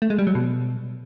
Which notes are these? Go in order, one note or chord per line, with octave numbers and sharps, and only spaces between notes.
A3
G#3
G3
F#3
B2